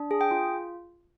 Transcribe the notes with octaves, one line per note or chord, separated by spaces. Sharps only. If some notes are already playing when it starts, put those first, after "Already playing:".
Already playing: D4
G#4
G5
F4